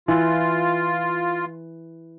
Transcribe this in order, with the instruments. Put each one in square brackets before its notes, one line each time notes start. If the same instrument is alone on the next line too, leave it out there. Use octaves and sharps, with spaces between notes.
[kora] E3 [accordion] F4